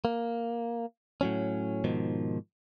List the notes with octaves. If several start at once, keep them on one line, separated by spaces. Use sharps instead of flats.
A#3
A2 F#3 C#4
G#2 B2 D#3 F3